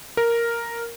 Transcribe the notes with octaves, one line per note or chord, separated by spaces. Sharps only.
A#4